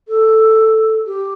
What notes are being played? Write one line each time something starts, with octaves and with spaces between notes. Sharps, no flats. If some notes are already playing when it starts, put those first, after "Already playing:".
A4
G4